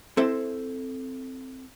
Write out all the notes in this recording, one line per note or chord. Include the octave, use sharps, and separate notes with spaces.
C4 E4 A4 C5 E5